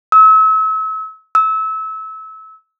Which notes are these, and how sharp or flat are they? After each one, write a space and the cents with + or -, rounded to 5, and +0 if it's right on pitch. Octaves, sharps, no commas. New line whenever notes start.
E6 -35
E6 -25